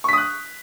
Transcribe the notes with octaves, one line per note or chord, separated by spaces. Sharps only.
C#6 D#6 F#6 B6